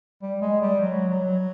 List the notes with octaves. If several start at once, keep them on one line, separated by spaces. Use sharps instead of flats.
G3
G#3
G3
F#3
F#3